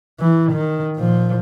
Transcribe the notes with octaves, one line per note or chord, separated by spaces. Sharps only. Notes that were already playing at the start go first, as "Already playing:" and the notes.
E3
D#3
A#2 F3